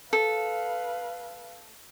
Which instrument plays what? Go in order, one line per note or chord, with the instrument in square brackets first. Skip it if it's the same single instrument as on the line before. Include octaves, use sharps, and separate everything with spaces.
[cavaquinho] A4 [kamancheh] B4 F5